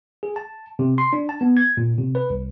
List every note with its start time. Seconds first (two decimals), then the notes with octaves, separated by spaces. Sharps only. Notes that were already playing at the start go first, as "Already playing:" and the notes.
0.23 G#4
0.36 A5
0.79 C3
0.98 C6
1.13 D4
1.29 A5
1.41 B3
1.57 G#6
1.77 A#2
1.98 C3
2.15 B4
2.30 C2